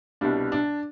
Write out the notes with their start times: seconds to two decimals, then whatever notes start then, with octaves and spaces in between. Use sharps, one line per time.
0.21 C2 B2 G3 D4
0.52 D4